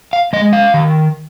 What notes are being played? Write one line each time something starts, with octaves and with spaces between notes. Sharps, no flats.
F5
G#3 D#5
F5
D#3